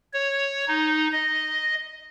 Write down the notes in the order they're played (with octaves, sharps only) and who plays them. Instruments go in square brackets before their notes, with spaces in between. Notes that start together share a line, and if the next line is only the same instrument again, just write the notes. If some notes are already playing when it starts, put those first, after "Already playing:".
[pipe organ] C#5
D#4
D#5